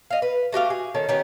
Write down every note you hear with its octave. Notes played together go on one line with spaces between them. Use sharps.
D#5 F5
B4
A3 F#4 G4 F5
G#4
D#3 C#4 A4
D#3 B3 C#4 G4